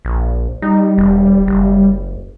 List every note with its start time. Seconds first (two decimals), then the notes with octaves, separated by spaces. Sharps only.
0.05 A#1
0.62 G3 D#4
0.98 E1
1.48 F#1